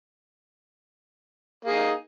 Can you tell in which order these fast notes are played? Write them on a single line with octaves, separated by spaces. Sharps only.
A#3 G#4 D#4